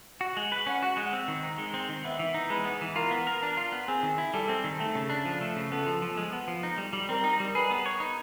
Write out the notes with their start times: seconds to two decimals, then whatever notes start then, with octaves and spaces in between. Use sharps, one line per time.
0.21 F#4 F#5
0.37 G#3
0.52 B4
0.67 C#4 F#5
0.83 F#4
0.97 G#3
1.13 C4
1.28 D#3
1.43 D#4
1.58 G#3
1.74 C4
1.89 D#3
2.04 B3 E5
2.19 E3
2.34 D#4
2.50 G#3 B4
2.65 B3
2.81 E3
2.96 F4 A#4
3.11 B3
3.27 A#4
3.43 D4
3.57 F4
3.72 B3
3.88 C4 G#4
4.03 D#3
4.18 E4
4.34 G3 A4
4.49 C4
4.64 D#3
4.79 A3 A4
4.95 C#3
5.10 D4
5.25 F3
5.41 A3
5.56 C#3
5.71 B3 A4
5.86 F3
6.02 F3
6.17 G#3
6.33 B3
6.48 F3
6.63 D#4
6.78 G3
6.93 G3
7.09 C4 A#4
7.24 D#4
7.40 G3
7.55 G#4 B4
7.70 B3
7.86 C#5
8.00 D#4